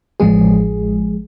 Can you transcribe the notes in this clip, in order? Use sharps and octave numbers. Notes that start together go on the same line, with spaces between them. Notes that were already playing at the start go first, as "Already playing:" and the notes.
A1 F3 G#3 G#4